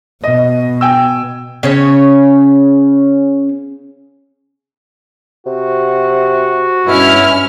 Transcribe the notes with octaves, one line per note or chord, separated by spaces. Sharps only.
B2 D#5
G5 G#5 E6
C#3 C#4 C#5
C3 F#4
G2 B2 C#4 E4 F6